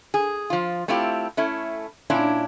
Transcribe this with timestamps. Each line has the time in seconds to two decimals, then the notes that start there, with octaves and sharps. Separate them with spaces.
0.14 G#4
0.50 F3 F4
0.88 A3 C4 E4 F4 G4
1.37 A3 C#4 E4
2.10 A#2 C#4 D4 E4